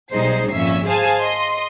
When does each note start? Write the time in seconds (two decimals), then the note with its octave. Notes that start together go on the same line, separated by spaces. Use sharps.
0.13 B1 G3 D#4 G#4 C5 C7
0.52 G#1 F2 A#2 C#4 E5
0.86 G#4 C5 F5 G#5 A5
1.20 D#5 C6